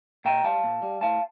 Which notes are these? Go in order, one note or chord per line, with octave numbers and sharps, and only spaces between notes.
A#2 G5 A#5
G3 F5 A5
A#2
G3
A2 F5 A5